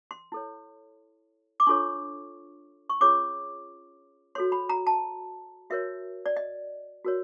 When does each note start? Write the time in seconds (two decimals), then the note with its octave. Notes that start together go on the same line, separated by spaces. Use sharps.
0.11 C6
0.32 E4 A4 C#5
1.60 D6
1.66 D4 F4 A4 C#5 C#6
2.90 C#6
3.01 C#4 F4 G#4 C#5 D6
4.35 F#4 A4 C#5 C6
4.52 B5
4.69 A#5
4.87 A5
5.70 F#4 A#4 C#5 E5
6.26 D5
6.37 D#5
7.05 F#4 A#4 C#5